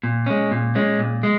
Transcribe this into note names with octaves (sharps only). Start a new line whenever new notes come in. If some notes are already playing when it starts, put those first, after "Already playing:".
A#2
G#3 C#4
A#2
G#3 C#4
A#2
G#3